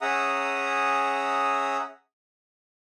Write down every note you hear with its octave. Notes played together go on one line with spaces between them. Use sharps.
C#4 G#4 E5 F#5 A#5 D#6